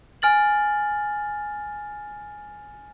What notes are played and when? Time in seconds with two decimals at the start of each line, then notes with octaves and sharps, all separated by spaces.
0.22 G#5 F6 A6 F#7